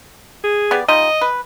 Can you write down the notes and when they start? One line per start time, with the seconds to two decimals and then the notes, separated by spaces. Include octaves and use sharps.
0.43 G#4
0.71 B3 G4 D5
0.88 G3 D#4 F4 D#5
1.21 B4